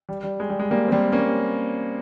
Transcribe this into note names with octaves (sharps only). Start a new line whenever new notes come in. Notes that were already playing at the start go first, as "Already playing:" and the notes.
G3
G3
G#3
G3
G#3
G3 A#3
C4
G3 A#3
A#3 C#4